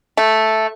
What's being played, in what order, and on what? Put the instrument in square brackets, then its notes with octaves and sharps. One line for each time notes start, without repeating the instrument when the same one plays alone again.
[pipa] A3